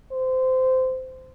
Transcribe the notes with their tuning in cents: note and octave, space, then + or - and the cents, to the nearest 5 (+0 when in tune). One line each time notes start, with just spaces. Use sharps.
C5 -20